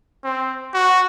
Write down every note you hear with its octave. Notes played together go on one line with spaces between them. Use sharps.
C4
F#4